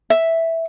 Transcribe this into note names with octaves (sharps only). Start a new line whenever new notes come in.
E5